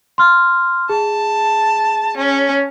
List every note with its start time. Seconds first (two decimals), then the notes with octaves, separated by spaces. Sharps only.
0.18 C6 F6
0.89 G#4 A5
2.17 C#4